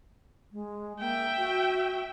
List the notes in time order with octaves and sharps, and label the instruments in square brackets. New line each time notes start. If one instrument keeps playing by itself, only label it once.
[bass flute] G#3
[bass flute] A#3 [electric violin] E5 G5
[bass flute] F#4